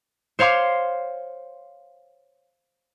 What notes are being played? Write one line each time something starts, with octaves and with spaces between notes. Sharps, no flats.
C5 C#5 F5 C6 D6